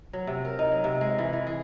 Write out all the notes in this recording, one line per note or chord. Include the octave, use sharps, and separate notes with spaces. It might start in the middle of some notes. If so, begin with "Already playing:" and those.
F#3
C3
A#4
D#4
F#3
C3
G#3
E3
E3
G#4